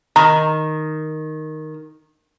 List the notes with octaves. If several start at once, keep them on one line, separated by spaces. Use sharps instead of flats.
D#3 A#5 B5